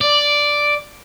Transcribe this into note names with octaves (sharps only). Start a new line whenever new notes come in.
D5